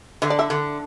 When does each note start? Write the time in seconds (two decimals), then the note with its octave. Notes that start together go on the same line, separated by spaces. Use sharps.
0.22 D3 E5
0.30 D5
0.39 E4 E5
0.50 D3